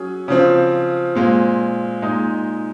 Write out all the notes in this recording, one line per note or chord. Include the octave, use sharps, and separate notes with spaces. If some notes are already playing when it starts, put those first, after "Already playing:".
Already playing: F#3 C#4 G#4
C#3 F3 C4
A#2 G#3 C4 F4
A#2 G#3 D#4